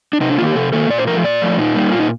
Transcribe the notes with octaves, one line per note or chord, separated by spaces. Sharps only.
D4
C3 D#4
D4
D#3 A#3 F4
G4
C3 A4
D#3 A#3 A4
A#2 D5
C5
F3 A3 A#4
A#2 D5
F3 A3
A#2 D#4
G3 A#3
A#2 F4
D#4